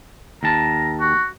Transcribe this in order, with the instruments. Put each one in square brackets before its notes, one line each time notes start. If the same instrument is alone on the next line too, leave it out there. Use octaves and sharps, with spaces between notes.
[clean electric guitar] D#2 A5 [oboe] A#5
[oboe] F#4